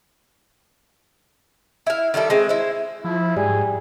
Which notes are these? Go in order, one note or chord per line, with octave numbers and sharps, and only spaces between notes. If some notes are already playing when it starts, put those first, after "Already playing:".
E4 F5
D#3 G3 E4 A4
G#3 A3 C4
E4 C5
F3 E4
G#2 G3 G#4